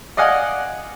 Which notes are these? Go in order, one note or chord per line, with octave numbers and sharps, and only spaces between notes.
D5 D#5 F5 F#5 G#5